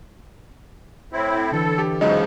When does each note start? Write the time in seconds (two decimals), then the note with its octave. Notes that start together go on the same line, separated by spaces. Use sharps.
1.13 A2 C4 E4
1.52 D3 E3 A4
1.78 G4
2.01 G#2 C#3 F3 F#3 G#3 D#4